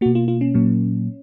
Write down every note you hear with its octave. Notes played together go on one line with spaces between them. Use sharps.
B2 A#3 F#4
F4
F4
C#4
A#2 F#3 A#3